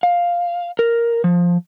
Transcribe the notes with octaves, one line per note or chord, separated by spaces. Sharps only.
F5
A#4
F3